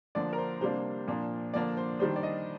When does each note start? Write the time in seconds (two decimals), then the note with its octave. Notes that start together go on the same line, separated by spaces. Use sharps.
0.15 D3 F3 A#3 D4 D5
0.33 A#4
0.38 C5
0.61 C3 G3 A#3 D4 C5
1.07 A#2 F3 A#3 D4
1.54 D3 F3 A#3 D4 D5
1.77 C5
1.99 D#3 G3 D4 C5
2.16 D5
2.23 D#5